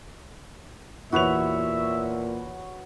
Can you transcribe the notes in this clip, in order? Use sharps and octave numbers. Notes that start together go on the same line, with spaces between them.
E2 A#2 F#4 B4 C#5 E5 F#6 F7